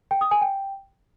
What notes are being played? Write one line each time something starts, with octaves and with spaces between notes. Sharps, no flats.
G5
D#6
G#5
G5